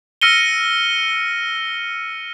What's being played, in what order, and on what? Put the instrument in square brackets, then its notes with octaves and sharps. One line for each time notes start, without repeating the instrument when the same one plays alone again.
[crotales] E6 F6 A#6 C#7 D#7 G7